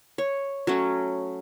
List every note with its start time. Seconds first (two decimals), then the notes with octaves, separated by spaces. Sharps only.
0.18 C#5
0.67 F#3 A3 C#4